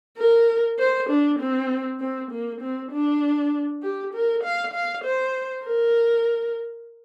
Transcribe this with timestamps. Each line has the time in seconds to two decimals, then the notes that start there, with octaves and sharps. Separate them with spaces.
0.18 A#4
0.79 C5
1.10 D4
1.40 C4
2.00 C4
2.31 A#3
2.61 C4
2.92 D4
3.83 G4
4.14 A#4
4.44 F5
4.74 F5
5.04 C5
5.66 A#4